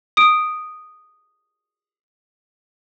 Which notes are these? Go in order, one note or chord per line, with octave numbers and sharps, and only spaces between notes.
D#6 D7